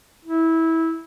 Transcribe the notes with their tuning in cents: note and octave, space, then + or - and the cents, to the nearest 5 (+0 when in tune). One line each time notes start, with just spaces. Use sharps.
E4 -20